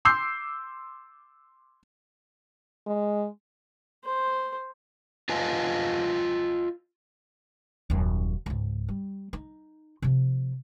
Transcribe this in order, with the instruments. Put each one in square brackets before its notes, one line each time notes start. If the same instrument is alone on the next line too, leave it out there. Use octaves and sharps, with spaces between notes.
[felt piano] C6 D6 E6 G6 C7
[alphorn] G#3
[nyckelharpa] C5
[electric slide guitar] F4 B4 D#5 F5 G#5 A5
[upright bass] D#1 F#2
C#2 G#2
G3
D#4
C3 F3